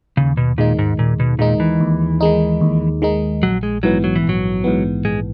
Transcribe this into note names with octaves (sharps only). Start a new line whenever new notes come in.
D#2 C#3
B2
A#2 D#3 G#3 D#4
G#2
D#2 A#2
B2
A#2 D#3 G#3 D#4
E3
D#2
D#3 G#3 D#4
D#2
D#3 G#3 D#4
A#1 F#3
G#3
G#2 E3 F#3 B3
F#3
E3
A#1
F#3
G#2 E3 B3
A#1 G#3